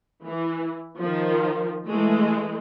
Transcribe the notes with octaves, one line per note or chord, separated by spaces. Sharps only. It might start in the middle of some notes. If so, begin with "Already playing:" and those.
E3
D#3 F3
E3 G#3 A3